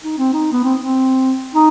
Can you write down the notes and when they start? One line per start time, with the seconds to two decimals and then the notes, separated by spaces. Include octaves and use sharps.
0.04 D#4
0.18 C4
0.33 D#4
0.52 B3
0.64 C4
0.79 C4
1.55 D#4